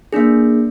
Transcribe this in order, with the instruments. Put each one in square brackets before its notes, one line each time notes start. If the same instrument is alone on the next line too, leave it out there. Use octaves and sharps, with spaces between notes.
[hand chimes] A#3 D4 G#4